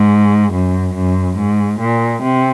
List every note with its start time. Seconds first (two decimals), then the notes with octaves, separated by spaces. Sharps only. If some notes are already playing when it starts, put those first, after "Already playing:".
Already playing: G#2
0.53 F#2
0.95 F#2
1.37 G#2
1.80 A#2
2.23 C3